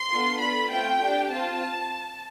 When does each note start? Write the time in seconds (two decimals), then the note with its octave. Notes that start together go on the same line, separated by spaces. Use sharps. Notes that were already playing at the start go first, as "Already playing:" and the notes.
Already playing: C6
0.10 B3 D4 F4 A4
0.40 B3 F4 A4 B5
0.70 A3 C4 F4 G5
1.01 D4 G4
1.31 C4 F4 A5